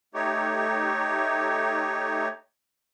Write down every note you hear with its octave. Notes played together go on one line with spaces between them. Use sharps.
A3 D#4 G4 C#5